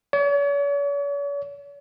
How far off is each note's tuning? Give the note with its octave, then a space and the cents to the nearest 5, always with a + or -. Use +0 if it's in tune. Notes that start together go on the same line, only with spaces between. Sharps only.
C#5 +45